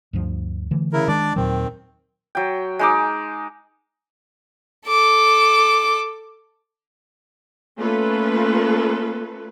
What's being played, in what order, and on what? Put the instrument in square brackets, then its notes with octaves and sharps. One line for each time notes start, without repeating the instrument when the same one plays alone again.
[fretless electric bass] D2 G2 F3
D3 E3 A3
[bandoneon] C#3 E4 A#4
[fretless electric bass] D#3 G#3 [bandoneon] D4 D5 D6
[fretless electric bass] D#2 A#2 F#3 [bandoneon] D#3 C4
[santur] F#3 G5
G#3 D#4 D6
[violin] A4 D6
[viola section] A3 A#3 C#4 F4 A4 B4